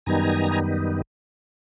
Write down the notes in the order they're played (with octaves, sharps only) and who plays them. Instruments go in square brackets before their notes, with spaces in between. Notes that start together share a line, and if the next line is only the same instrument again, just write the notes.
[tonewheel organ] F#2 D#3 G3 B3 D#4 G#5 A#5